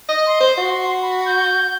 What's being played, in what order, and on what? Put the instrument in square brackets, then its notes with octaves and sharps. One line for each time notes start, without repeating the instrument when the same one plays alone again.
[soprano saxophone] D#5
[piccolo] C6
[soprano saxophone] C5
F#4
[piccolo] B5
G6